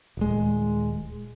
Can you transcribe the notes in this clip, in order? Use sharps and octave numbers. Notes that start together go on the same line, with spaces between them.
D#1 G#3